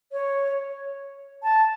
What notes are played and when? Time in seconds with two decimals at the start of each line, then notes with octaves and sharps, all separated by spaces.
0.12 C#5
1.43 A5